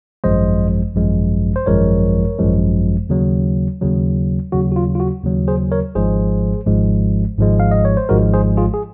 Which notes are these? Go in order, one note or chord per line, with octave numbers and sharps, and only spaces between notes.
G#1 F#2 F3 G#3 C5 D#5
G#1 F#2 F3 G#3
C5
G#1 F#2 F3 G#3 A#4 C#5
G#1 F#2 F3 G#3
D#2 C#3 F#3
D#2 C#3 F#3
D#2 C#3 F#3 F#4
F#4
F4
F4
F#4
D#2 C#3 F#3
G#4 C5
A#4 C#5
G#1 G#2 F3 G#3 G#4 C5
G#1 G#2 F3 G#3
G#1 G#2 F3 G#3
F5
D#5
C#5
C5
G#1 G#2 F3 G#3 F#4 A#4
G#4 C5
F4 G#4
G#4